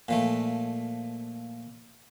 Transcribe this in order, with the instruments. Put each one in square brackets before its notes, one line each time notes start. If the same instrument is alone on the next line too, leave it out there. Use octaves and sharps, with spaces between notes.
[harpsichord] A#2 F3 A3